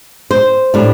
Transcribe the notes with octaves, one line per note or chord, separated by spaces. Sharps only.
C5
A2 G3 D4